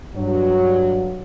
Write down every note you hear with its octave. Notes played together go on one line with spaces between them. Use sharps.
G2 F#3